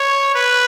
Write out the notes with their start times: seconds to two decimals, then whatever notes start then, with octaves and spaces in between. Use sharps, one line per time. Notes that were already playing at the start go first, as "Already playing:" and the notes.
Already playing: C#5
0.35 B4